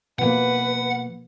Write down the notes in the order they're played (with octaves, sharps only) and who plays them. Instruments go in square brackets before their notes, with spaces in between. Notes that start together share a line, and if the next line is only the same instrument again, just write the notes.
[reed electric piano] B2 F3 A#3 [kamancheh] B4 [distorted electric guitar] F#5